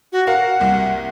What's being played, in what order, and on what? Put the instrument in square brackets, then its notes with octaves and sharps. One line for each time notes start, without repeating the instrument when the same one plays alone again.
[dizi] F#4
[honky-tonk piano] F#4 A#4 F5 [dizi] F#5
[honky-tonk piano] C2 A#3